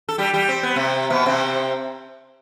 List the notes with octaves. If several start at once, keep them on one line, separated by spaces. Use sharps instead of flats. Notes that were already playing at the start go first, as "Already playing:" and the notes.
A4
G3 G4
G3 G4
C4
B3
C3 C4
B2 B3
C3 C4